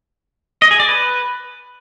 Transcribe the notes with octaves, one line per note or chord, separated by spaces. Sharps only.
D#5
G#4
D5
B4